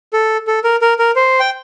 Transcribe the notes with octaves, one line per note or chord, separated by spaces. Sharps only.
A4
A4
A#4
A#4
A#4
C5
G5